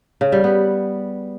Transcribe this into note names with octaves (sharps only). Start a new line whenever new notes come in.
C#3
G3
B3